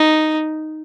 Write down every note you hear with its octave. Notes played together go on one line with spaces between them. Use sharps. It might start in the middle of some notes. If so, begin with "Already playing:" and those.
Already playing: D#4